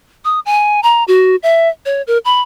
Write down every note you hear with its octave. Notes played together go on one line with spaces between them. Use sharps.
D#6
G#5
A#5
F#4
E5
C#5
A#4
B5